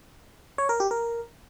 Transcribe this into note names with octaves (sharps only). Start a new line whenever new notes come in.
C#5
A#4
G4
A#4